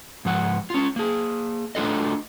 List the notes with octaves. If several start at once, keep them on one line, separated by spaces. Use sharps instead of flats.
G#2 F3 F#5
C#4 F4
A#3 G#4
A3 D4 F4 A4 D#5